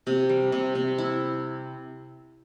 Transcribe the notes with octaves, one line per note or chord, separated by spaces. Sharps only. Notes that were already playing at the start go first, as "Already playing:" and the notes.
C3 G4
G3 G4
C3
C3
E4